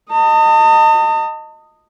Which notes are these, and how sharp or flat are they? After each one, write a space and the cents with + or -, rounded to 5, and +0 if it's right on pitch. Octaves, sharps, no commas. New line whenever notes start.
D#5 -5 A5 +45